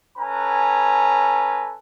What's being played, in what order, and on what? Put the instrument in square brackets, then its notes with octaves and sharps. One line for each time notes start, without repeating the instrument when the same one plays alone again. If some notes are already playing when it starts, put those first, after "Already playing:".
[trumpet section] C#4 A4 B4 G#5 A#5